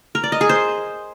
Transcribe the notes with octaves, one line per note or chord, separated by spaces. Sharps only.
A#4
D5
D#5
G#4
C5